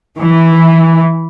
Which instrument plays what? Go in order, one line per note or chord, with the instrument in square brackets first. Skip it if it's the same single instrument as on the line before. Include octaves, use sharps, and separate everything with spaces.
[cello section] E3